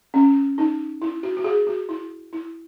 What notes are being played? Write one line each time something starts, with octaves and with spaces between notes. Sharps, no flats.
C#4
D#4
E4
F#4
F#4
G#4
F#4
E4
E4